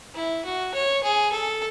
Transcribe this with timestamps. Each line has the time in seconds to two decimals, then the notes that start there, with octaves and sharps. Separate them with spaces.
0.15 E4
0.44 F#4
0.74 C#5
1.03 G#4
1.32 A4